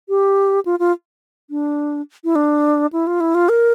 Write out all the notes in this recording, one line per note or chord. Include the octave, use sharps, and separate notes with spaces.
G4
F4
F4
D4
E4
D4
E4
F4
E4
F4
A#4